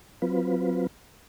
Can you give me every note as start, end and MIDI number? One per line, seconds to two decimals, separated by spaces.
0.22 0.87 54
0.22 0.87 60
0.22 0.87 65
0.22 0.87 71